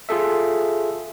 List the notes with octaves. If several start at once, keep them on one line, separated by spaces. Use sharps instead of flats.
F4 G#4 A4 E5